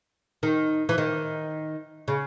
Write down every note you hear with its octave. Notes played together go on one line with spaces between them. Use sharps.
D#3
E3
D#3
C#3